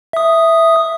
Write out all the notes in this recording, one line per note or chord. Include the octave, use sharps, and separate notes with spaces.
E5 D#6